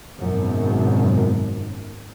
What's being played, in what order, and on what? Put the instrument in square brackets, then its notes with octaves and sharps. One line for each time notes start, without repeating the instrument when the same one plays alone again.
[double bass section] G#1 F#2 B2